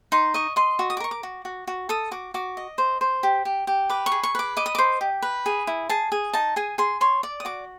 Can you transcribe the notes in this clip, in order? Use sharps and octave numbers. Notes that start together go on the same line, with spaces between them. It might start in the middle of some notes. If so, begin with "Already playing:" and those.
D#4 C6
D#5 C#6
D#5 C6
F#4
D#6
D6
A#4 C#6
D6
F#4
F#4
F#4
A4 D#6
F#4 D6
F#4 D6
D#5
C5
C5
G4
G4
G4
B4 D6
C#6
G#4
C#6
B4 D6
D#5 D6
D#6
C5 D6
G4
B4
G#4
E4
G#4 A5
G#4
D#4 A5
G#4 G#5
G#4 C6
C#5 C6
D5 D6
D#6
F#4 D6